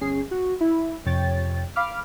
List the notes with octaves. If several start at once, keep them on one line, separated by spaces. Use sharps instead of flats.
G1 C#4 G#4 C7
F#4
E4
F2 C3 C#5 G5 A6
F5 B5 D6 F6